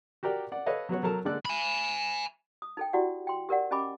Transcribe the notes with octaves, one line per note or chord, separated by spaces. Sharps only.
F#4 G4 A#4 D5 G5
D5 F#5
A4 B4 C#5 D#5 F5
F#3 B3 F#4 C#5
F#3 A4 A#4 A5
D3 G#3 A#3 A4 D5 F#6
G#5 B5
D#6
D#4 A4 G5
E4 F#4 G4 D5 F#5
G5 C6
G4 A#4 D5 F#5
C#4 G4 D#5 G#5 B5 D6